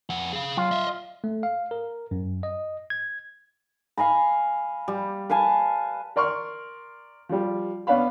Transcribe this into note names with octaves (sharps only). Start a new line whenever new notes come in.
F2 F#5
G#4 F5
F#3 F4
D#5 E5
A3
F5
A#4
F#2
D#5
G#6
F5 G#5 A#5 B5
G3
B4 F5 G#5 A5
A#4 D5 C6 C#6 F6
F3 G3
B3 C#4 D4 B4 F5 B5